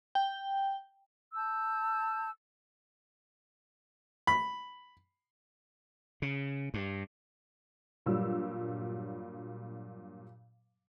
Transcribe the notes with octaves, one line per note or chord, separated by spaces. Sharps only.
G5
A5 E6 G6
B5
C#3
G2
G2 A#2 F#3 G3 E6